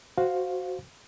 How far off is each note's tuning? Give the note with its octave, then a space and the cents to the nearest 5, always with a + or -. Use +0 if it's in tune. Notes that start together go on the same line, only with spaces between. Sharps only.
F#4 +0 C5 +0 F5 +10